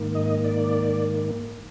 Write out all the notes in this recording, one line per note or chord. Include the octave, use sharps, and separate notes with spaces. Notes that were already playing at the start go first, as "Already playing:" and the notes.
Already playing: G#2 D#3 A#3
D#5
D5